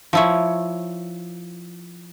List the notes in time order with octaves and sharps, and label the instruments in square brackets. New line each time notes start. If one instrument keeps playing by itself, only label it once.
[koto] F3 E4 C#5